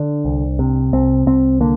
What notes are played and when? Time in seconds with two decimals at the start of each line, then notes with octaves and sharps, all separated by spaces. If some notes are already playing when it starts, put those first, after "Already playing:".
Already playing: D3 D4
0.25 C2
0.59 C3
0.93 C2 C4
1.26 C2 C4
1.61 D3 A#3